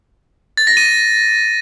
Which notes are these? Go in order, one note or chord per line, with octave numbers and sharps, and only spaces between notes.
A6
A#6
D#7